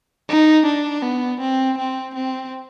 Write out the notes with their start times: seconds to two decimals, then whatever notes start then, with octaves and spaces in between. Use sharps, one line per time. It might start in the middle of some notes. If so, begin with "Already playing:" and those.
0.29 D#4
0.66 D4
1.02 B3
1.41 C4
1.78 C4
2.15 C4